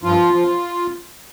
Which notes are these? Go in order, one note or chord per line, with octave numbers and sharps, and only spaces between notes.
G2 F3 F4
F3